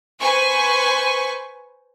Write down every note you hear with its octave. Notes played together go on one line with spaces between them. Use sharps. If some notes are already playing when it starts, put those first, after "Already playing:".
B4 C5 G#5 C#6